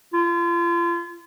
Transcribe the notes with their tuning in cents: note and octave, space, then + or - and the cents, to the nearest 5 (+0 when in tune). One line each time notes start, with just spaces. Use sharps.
F4 -35